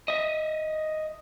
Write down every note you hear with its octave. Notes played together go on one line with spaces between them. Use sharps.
D#5 E5